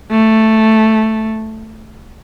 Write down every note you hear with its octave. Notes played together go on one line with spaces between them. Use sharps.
A3